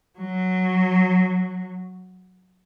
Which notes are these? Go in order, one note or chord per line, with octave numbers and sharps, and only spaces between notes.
F#3